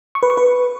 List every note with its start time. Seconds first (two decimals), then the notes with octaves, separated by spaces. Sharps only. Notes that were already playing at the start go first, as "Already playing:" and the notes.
0.15 C#6
0.23 B4
0.30 C#6
0.37 B4